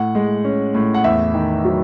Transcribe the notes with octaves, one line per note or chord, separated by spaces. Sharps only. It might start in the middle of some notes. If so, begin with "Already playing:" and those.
Already playing: A2 F#5
G#3
C#4
A2
F#5
E2 E5
D#3
F#3